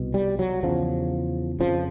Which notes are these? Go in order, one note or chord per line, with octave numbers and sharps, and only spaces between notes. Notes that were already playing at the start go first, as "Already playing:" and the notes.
Already playing: C2 B2
G3
F#3
E2 C#3 F3
F2 C#3 F3